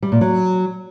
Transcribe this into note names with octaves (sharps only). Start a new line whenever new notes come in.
G3
A#2
F#3